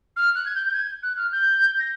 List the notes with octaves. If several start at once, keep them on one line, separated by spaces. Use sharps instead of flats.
F6
F#6
G#6
G6
G6
G#6
F#6
F6
G6
A#6